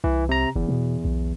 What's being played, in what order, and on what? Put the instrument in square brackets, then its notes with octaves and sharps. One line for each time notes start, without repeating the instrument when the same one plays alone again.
[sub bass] C2 [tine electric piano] E3
[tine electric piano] C3 A#5
[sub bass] F#1 [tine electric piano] E2
[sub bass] B2
B1